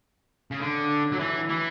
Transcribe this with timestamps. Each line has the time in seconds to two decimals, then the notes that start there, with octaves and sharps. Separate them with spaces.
0.51 C#3
0.60 D3
1.12 F#3
1.19 E3
1.49 E3